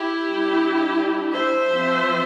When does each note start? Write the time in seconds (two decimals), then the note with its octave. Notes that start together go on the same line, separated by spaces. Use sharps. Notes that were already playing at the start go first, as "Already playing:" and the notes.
Already playing: E4 G4
0.27 G3 D4
1.34 C5 E5
1.71 F3 C4